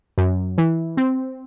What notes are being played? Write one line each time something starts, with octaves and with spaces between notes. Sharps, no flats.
F#2
E3
C4